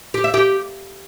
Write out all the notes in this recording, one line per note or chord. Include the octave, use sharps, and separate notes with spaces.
G4
E5
G4